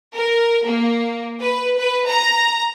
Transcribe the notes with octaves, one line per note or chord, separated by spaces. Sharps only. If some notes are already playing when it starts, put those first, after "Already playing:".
A#4
A#3
B4
B4
A#5